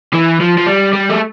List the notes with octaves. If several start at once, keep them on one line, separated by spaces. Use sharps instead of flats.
E3
F3
F3
G3
G3
A3